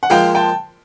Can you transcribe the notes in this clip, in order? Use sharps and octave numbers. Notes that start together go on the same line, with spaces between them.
F#5
A#2 F3 G#3 F5 G5
G5 A5